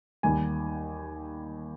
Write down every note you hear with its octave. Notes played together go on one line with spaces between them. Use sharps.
D#2 D#3 G3 G#5